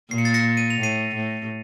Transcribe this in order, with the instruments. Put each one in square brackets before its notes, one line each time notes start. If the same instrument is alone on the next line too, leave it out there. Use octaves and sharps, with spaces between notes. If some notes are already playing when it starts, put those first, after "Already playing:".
[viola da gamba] A#2 [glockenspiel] C7
[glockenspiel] C#7
A6 C7
A#6 C#7
D#7
F7
[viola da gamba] A2 [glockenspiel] C7 D#7
[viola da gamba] A2